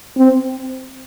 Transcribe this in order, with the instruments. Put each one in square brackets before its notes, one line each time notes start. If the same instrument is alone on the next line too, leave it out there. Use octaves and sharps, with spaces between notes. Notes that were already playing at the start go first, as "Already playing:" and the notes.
[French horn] C4